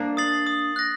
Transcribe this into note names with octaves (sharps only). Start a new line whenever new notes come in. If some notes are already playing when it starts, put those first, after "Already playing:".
Already playing: A#3 D4
D#6 A6 C7 F#7
D#6
F#6 A#6